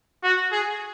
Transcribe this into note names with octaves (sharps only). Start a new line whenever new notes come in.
F#4
G#4